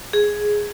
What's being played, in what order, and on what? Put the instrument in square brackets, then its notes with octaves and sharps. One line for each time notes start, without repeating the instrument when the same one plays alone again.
[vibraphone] G#4